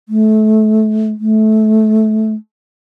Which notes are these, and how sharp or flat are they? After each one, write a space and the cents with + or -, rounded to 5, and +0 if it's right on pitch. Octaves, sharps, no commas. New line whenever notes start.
A3 -25
A3 -20